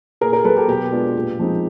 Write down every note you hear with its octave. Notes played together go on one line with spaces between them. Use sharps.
A#2 G#4 A#4
G#4 A#4
F#3 A#3 A4 B4
G4 A4
B2 G4
G#3 B3 D4 F4
A#2
F3 G#3 C4 D#4